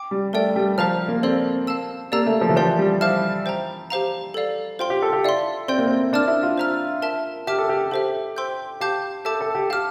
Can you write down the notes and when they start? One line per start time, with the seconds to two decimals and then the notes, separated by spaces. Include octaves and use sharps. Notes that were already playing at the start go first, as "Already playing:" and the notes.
Already playing: G5 D6
0.11 G3
0.33 A3 A#4 D5 G5
0.56 G3
0.78 F3 C5 F5 A#5 F6
1.08 A#3
1.23 C4 A4 D5 F5 C6
1.67 F5 A5 E6
2.12 A#3 G4 D5 F5 A#5 E6
2.27 A3
2.41 F3
2.49 E3
2.56 F3 G4 D5 G5 C6 G6
2.78 G3
3.01 E4 C5 F5 A5 D6 F6
3.46 C5 G5 A#5
3.90 G4 C5 F5 A#5
4.34 A4 D5 F5
4.79 F4 C5 G5 C6
4.90 G4
5.02 A4
5.13 G4
5.24 E4 D5 F5 C6
5.68 C4 D5 G5 C6 G6
5.78 A#3
5.87 C4
6.13 D4 D5 A5 D6 F6
6.28 E4
6.43 F4
6.58 C5 E5 A#5 F6
7.02 A#4 E5 A5
7.47 G4 E5 A5 D6 F6
7.58 A4
7.69 G4
7.91 G4 A4 C5 E5
8.37 C5 G5 C6 E6 G6
8.80 G4 F5 A5 D6 G6
9.25 A4 E5 A5 D6 G6
9.41 A4
9.55 G4
9.70 G4 F5 A5 D6 F6